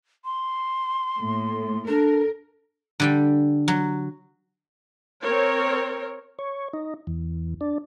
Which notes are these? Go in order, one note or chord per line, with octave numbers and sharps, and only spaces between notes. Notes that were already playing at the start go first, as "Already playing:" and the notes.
C6
A2 A#3
D4 A4 A#4
D3 G3 G5
F#3
C4 A#4 C#5
C#5
D#4
E2
D4